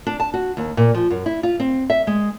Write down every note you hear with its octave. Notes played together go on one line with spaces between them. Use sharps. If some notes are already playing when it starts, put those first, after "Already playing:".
D4
A5
F#4
D#2
A#2
F3
F#2
E4
F4
C4
E5
G#3